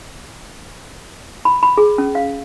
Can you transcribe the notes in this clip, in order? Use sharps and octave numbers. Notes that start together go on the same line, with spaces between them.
B5
B5
G#4
C#4
F5